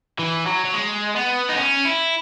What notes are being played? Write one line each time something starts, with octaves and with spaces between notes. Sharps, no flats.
E3
F#3
F#3
G#3
B3
D#4
C#4
E4